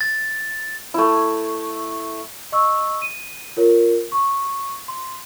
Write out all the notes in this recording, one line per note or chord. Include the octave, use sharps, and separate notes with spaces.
A6
A3 E4
D#5 C#6 E6
D#7
F4 A#4 C#5
C#6
C6